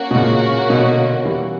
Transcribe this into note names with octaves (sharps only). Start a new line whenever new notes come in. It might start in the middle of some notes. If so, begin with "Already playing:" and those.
Already playing: A#3 C#4 F#4
B2
A#2 C#3
B2 D3
E3 G3